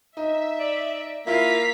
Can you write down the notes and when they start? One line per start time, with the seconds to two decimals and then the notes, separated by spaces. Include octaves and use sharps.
0.17 D#4 E5
0.58 D5
1.27 A#3 E4 F4 F5 B6